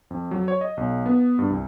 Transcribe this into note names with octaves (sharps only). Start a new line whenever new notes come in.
F2
F#3
C#5
D#5
B1
B3
G2
C2